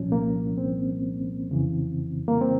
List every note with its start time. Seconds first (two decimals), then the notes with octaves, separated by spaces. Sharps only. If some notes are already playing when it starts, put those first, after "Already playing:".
Already playing: C2 A#2 F3 C#4
0.12 A#3
0.58 C4
1.50 F2 C#3 E3
2.28 A#3
2.41 C4